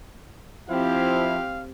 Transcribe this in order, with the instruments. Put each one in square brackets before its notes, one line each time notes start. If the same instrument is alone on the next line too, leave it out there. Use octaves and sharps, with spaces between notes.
[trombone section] F3 E4 [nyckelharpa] C4 G4 [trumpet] F5